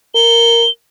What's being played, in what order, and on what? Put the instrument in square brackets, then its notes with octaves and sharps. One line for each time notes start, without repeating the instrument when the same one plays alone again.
[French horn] A#4 [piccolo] G7